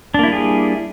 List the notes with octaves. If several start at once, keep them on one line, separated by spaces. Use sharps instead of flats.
G3 A#3 D4 E4 G#4